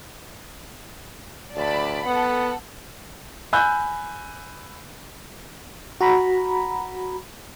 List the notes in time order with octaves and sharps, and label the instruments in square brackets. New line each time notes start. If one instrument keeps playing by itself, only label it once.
[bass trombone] D2 [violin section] D5 A5 B5
[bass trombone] B3 [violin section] A4 F#5
[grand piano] G#5 B5 E6 F#6 G6
[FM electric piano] F#4 A#5 B5